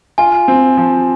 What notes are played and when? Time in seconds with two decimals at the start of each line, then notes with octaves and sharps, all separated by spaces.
0.18 F4 G#5
0.48 C4
0.77 F3